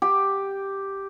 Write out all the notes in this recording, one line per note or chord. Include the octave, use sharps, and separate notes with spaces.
G4